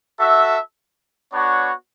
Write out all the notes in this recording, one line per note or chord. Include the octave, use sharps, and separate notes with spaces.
F#4 A4 E5
B3 D4 F#4 C#5